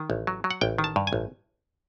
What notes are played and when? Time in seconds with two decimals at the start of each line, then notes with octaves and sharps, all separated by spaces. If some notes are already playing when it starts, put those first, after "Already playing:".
Already playing: D#3
0.10 A1
0.27 F#3
0.44 F#3
0.51 F#5
0.61 A1 G5
0.78 D#3
0.84 A5
0.96 G2
1.07 G#5
1.13 A1